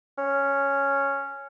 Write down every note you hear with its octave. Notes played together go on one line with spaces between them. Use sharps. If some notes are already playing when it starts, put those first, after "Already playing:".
C#4